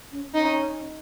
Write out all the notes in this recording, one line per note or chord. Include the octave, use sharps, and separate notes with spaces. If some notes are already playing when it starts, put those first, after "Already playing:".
C#4
C#4 D#4